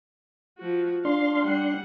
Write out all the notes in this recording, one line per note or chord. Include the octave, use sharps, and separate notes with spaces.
F3 F#4
D4 F5 C6
G3 F#5